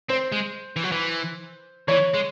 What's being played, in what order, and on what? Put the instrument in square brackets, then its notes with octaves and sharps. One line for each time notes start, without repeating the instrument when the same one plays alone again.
[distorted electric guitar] C4 [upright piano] C5
[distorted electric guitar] G#3
E3
F#3
E3
[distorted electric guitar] E3 [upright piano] C#5
[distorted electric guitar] G#3